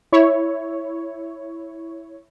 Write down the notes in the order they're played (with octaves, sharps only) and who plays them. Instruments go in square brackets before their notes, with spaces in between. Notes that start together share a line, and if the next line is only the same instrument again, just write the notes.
[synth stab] E4 C#5